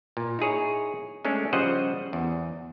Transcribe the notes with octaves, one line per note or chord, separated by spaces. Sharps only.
A#2
D#4 E4 G#4 C#5
G#3 A3 C#4 D4
C#3 F3 G3 C5 D#5 F#5
E2